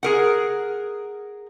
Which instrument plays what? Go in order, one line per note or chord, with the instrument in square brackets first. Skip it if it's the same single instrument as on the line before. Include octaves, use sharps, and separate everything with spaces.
[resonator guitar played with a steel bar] G#4 A#4 F#5